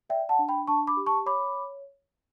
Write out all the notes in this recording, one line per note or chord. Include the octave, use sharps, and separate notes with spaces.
D5 E5 G5
F#5 A5
D4
G5 B5
D4 A5 C#6
B5 D6
G4
A5 C#6
C#5 B5 D6